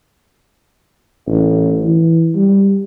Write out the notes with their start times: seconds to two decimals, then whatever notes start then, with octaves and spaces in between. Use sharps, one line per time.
1.27 A1
1.84 E3
2.35 G3